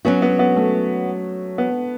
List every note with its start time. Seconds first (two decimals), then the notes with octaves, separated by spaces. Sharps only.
0.05 F#3 B3 C#4 F#4
0.22 B3
0.39 B3
0.56 A3
1.58 B3